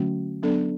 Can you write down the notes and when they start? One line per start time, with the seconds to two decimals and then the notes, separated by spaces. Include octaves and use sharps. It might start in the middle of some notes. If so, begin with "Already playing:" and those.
Already playing: D3 F#3 A3 C#4 F#4
0.43 F#3 B3 D4 A4 D5